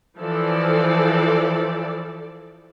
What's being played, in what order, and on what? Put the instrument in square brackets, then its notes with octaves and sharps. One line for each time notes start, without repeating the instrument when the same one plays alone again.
[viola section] E3 F3 A4 D5